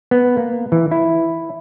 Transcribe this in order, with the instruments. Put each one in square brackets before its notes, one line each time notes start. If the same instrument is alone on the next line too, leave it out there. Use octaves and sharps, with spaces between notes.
[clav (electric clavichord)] B3
A#3
E3
E4